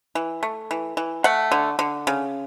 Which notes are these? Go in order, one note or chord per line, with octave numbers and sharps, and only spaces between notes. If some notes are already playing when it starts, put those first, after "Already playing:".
E3
A3
E3
E3
A3 F#5
D3
D3
C#3